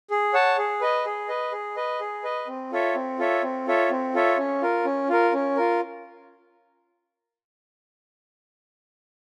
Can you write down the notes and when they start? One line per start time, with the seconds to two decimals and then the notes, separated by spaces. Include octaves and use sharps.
0.10 G#4
0.34 C#5 F#5 A5
0.58 G#4
0.81 B4 D#5
1.05 G#4
1.29 B4 D#5
1.52 G#4
1.76 B4 D#5
2.00 G#4
2.24 B4 D#5
2.47 C4
2.72 F4 A4 C#5 E5
2.95 C4
3.19 F4 A4 C#5 E5
3.43 C4
3.67 F4 A4 C#5 E5
3.91 C4
4.14 F4 A4 C#5 E5
4.38 C#4
4.62 F4 A#4
4.85 C#4
5.09 F4 A#4
5.33 C#4
5.56 F4 A#4